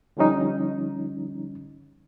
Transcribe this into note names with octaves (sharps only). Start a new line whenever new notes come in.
D3 F3 G3 C#4 D#4